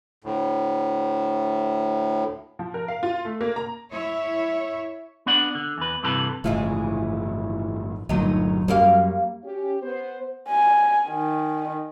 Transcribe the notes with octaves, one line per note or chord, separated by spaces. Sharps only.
D2 A2
F3
A#4
F5
F4
A3
A#3
A#5
E4 C#5 E5
B3 D4 D5 F#5
D3
E2 B4
G2 C3 E3 A4 B4
G1 A2 C#3 E3 F3 G#3
G1 D2 A#2 F#3 D#4
F#2 F#3 G3 A#3 F5
C#4 G4
B3 C5
G#5
D#3